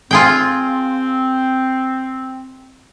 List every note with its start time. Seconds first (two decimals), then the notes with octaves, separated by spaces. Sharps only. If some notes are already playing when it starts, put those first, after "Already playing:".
0.11 C4 F4 G#4 G5